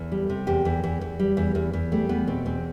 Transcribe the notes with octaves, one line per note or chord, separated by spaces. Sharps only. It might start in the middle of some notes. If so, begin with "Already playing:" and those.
Already playing: E2 A4
G3
C3
E2 G4
E2
E2
E2
G3
E2
E2
E2
G3 A3
E2 B3
B2 C4
E2 C4